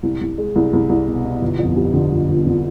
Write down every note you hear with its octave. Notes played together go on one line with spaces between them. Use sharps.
C2
C2
G#3
C2
C2
C2
B2
B2
G1
F2
G3
D3
G1
G1
D3